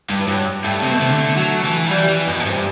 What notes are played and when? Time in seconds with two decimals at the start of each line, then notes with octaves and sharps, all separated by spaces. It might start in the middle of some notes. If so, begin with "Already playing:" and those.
0.10 G2
0.20 E3
0.28 G2 F#3
0.64 G2 A3
0.82 C3
0.92 B2
1.01 C3
1.09 D3
1.37 F#3
1.64 E3
1.86 F#3
1.91 E3 G3
2.09 E3
2.27 F#2 B2
2.40 A2
2.45 G2 C3